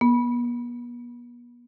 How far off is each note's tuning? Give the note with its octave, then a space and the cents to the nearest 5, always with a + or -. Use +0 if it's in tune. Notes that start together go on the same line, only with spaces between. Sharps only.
B3 -40